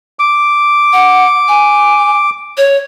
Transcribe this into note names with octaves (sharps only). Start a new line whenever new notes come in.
D6
F#5
G#5
C#5